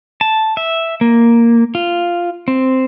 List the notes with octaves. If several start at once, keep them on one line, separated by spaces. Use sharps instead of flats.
A5
E5
A#3
F4
C4